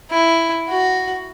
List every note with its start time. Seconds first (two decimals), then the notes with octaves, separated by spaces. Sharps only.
0.11 E4
0.68 F#4